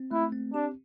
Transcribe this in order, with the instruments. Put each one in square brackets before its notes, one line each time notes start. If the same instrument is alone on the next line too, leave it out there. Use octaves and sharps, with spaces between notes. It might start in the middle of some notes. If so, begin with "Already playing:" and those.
Already playing: [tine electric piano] C4
[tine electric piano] A3 [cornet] E4
[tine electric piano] C4
[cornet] D4 [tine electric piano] G4